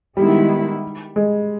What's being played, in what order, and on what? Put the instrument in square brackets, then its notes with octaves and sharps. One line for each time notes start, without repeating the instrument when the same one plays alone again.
[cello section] D#3 G#3 B3 E4 [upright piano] G3
[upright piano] G#3